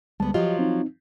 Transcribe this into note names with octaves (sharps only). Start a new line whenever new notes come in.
D2 G3 G#3 B3 A5
F3 F#3 F4 G4 D#5
C4 D#4